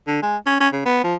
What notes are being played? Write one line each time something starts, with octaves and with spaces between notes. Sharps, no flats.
D3
G#3
C#4
C#4
C#3
B3
F3